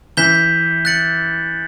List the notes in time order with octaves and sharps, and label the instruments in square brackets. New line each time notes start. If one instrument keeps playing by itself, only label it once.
[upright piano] E3 [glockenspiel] G6 B6 E7 G7
[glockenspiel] F#6 A6 C#7 F#7